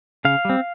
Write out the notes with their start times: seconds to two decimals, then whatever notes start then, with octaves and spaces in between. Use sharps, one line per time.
0.25 C#3 F5
0.45 G3 C4